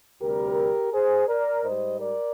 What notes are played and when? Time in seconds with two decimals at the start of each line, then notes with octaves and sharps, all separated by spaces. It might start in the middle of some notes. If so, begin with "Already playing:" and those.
0.21 D2 C3 G3 G4 A#4
0.93 G#4 C5
1.28 A#4 D5
1.64 G#2 G3 C5 D#5
1.99 A#4 D5